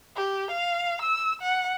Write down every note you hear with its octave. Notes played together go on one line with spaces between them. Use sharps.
G4
F5
E6
F#5